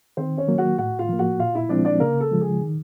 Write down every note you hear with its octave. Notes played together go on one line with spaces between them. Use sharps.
D#3 C4 C5
C#4 C#5
F#3 A#3
F#4 F#5
A2 F#4 F#5
F4 F5
F3 A#3
F#4 F#5
A#2 F4 F5
E4 E5
F3 G#3 C4 D4 E4 D5
D4 D5
C#3 A#3 A#4
A4
F3 G#3
G#4
D#3